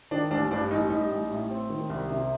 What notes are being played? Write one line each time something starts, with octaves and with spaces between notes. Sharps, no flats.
D#3 D4
A1 D4
G2 D4
A1 D#4
G3 D#4
A1
A2
C4
D#3
C2
C3